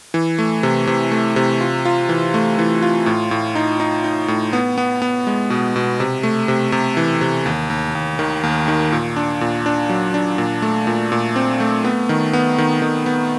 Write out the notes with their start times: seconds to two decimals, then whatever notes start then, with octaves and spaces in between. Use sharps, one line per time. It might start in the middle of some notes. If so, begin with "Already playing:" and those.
0.14 E3
0.39 A3
0.63 C3
0.87 C3
1.11 A3
1.36 C3
1.61 F4
1.85 F4
2.09 E3
2.34 A3
2.59 E3
2.82 F4
3.06 A2
3.31 A2
3.55 D#4
3.80 D#4
4.04 D#4
4.28 A2
4.53 B3
4.78 B3
5.02 B3
5.27 G#3
5.50 B2
5.76 B2
6.00 C3
6.23 A3
6.48 C3
6.72 C3
6.97 E3
7.21 C3
7.46 D#2
7.70 D#2
7.95 D#2
8.19 D#3
8.43 D#2
8.68 D#3
8.92 A#2
9.16 D4
9.41 A#2
9.66 D4
9.90 F#3
10.14 D4
10.38 A#2
10.62 A3
10.87 A#2
11.12 A#2
11.36 C4
11.60 A3
11.85 B3
12.09 D#3
12.33 B3
12.58 D#3
12.82 D#3
13.06 B3